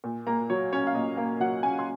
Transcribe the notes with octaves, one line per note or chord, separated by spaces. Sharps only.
A#2
A#3 A#5
F#3 C#5
C#4 C#5
F5
A#2 D#5
A#3 F5
F#3 F#5
C#4 G#5
C6